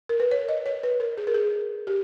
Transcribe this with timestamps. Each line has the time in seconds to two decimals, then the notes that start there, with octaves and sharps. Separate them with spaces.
0.09 A#4
0.20 B4
0.31 C#5
0.48 D#5
0.66 C#5
0.83 B4
1.00 A#4
1.18 G#4
1.27 A#4
1.34 G#4
1.87 G4